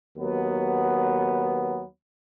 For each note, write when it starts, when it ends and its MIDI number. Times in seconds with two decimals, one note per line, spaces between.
0.17 1.82 39
0.17 1.82 54
0.17 1.82 59